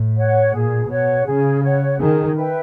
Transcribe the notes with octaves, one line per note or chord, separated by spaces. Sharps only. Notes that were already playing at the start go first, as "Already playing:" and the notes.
Already playing: A2
C#5 F#5
A#2 G#4
B2 C#5 F#5
C#3 G#4
C#5 F#5
D#3 G#4
B4 E5 G5